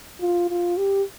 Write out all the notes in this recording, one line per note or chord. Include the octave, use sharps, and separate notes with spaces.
F4
F4
G4